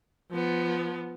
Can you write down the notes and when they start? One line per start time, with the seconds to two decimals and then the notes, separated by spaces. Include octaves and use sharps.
0.31 F3 B3